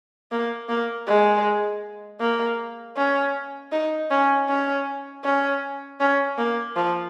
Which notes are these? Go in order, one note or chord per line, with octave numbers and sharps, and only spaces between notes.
A#3
A#3
G#3
A#3
C#4
D#4
C#4
C#4
C#4
C#4
A#3
F3